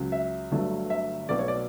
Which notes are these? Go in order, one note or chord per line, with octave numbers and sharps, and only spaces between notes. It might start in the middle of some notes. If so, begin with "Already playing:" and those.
Already playing: C#2 C#3 F#3
E5
G1 G2 F#3 A3
E5
B1 B2 F#3 A3 D5
C#5
D5